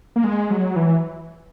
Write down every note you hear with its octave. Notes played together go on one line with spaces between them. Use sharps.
A#3
G#3
F#3
E3